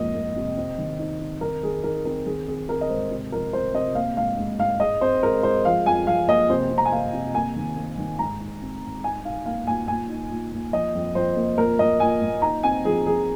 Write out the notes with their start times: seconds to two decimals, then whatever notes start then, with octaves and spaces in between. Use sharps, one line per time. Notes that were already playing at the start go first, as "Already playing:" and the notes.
Already playing: F2 G#2 A#3 D#5
0.14 A#3
0.36 C3
0.57 C4
0.78 D#3
0.99 D#4
1.20 C4
1.41 D#3 A#4
1.63 D#3 G#4
1.83 D#4 A#4
2.05 C4 A#4
2.26 D#3 G#4
2.47 C4 G#4
2.69 C4 A#4
2.81 D#5
2.90 G#2 C5
3.11 C3
3.32 F3 A#4
3.53 C4 C5
3.74 C3 D#5
3.95 A#3 F5
4.17 G#2 F5
4.38 G#2
4.59 G#2 F5
4.80 G#3 D#5
5.01 C4 C5
5.23 G#3 A#4
5.43 G#3 C5
5.65 F3 F5
5.86 F2 G#5
6.07 F2 F5
6.28 A#3 D#5
6.49 C3 C5
6.71 C3
6.78 A#5
6.85 G#5
6.92 A#3 F5
7.13 C3
7.34 A#3 G#5
7.56 D#3
7.77 A#3
7.98 D#3
8.19 G#2 A#5
8.41 D#4
8.62 C4
8.83 G#2
9.04 D#4 G#5
9.25 D#4 F5
9.46 A#3 F5
9.67 A#2 G#5
9.88 A#2 G#5
10.09 D#4
10.30 A#2
10.52 A#2
10.73 F3 D#5
10.95 F2
11.15 F2 C5
11.36 A#3
11.58 A#2 A#4
11.79 A#2 D#5
12.00 A#2 G#5
12.22 A#2
12.42 D#4 A#5
12.63 C4 G#5
12.85 F3 G#4
13.06 F3 G#4